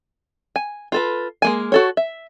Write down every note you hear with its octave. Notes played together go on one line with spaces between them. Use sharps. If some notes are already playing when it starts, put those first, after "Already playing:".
G#5
F4 A4 B4
G#3 A#3 G#5
F#4 A4 C#5
E5